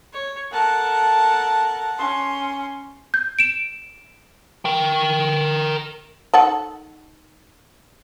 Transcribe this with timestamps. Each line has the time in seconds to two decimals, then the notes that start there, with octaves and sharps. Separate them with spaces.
0.13 C#5
0.52 A4 A#4 F#5 A5
1.98 C#4 C6
3.14 G6
3.39 D7 E7
4.65 A#4 G5
6.34 D#3 A4 F#5